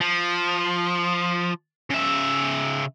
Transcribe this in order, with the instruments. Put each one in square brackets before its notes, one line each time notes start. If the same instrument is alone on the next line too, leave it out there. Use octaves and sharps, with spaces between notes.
[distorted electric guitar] F3
C#3 E5